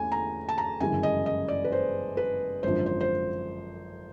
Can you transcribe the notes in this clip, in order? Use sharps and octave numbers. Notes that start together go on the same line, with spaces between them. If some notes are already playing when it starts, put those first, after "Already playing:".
Already playing: E2 A3 C#4 G#5
A#5
A5
A#5
G1 F#2 C#3 E3 G#3 G#5
D#5
D#5
D5
B4
C5
B4
G#1 F#2 D3 F3 C5
C5
C5